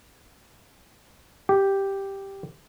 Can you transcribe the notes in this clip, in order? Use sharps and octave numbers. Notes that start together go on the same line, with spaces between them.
G4